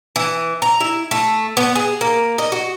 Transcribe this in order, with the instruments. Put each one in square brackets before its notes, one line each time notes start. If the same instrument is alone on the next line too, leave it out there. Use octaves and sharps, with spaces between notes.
[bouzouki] E3
A#5
E4
A3
B3
G#4
A#3
D#5
F#4